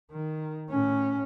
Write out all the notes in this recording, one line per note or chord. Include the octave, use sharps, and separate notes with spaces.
D#3
A2 C#4